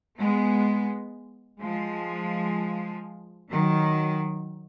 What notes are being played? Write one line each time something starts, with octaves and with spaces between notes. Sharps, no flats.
G#3 B3
F3 G#3
D#3 F#3